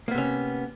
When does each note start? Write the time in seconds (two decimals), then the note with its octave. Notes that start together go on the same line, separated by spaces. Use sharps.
0.08 A#3
0.11 B3
0.14 C3
0.18 C#4